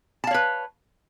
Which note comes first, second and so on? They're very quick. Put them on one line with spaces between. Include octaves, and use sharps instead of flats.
A5 F5 C#5 B4